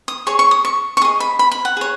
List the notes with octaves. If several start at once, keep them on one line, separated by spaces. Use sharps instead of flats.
D#6
G#4 C#5 C#6
C#6
D#6
C#6
C#6
G#4 D#5 D#6
B5
B5
B5
F#5
G#4 C#5